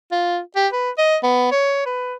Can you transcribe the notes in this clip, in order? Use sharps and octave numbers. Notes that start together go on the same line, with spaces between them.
F4
G4
B4
D#5
B3
C#5
B4